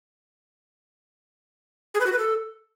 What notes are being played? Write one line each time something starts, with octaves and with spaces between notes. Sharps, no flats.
G#4
B4
F#4
B4
A4